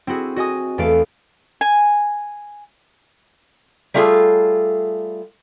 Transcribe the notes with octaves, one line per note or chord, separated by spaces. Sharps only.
C4 E4 F#4 G#4
F#4 D#5 G#5 D#6
E2 E3 A3 A4 F5 D7
G#5
G3 A3 F4 F#4 G#4 A4